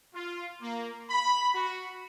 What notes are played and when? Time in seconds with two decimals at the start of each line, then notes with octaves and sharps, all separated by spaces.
0.14 F4
0.62 A#3
1.10 B5
1.54 F#4